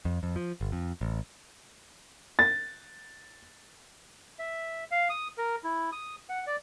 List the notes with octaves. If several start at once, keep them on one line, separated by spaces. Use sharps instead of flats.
F2
F2
F3
G1
F2
A1
A6
E5
F5
D#6
A#4
E4
D#6
F#5
D5